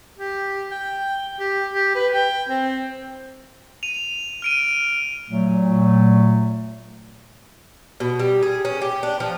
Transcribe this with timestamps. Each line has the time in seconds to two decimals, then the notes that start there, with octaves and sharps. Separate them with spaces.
0.18 G4
0.71 G5
1.39 G4
1.74 G4
1.95 B4
2.13 G5
2.49 C4
3.83 D#7 F7
4.42 F6 D7 D#7
5.29 A#2 F#3 A3
8.00 B2
8.19 G3
8.43 G#4
8.65 C#4
8.81 G4
9.03 D4
9.20 F3